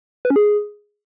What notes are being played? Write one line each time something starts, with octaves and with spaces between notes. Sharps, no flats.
B4
C#4
G#4